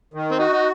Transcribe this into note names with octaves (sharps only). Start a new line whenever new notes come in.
D#3
C4
D#4 F#4
D#4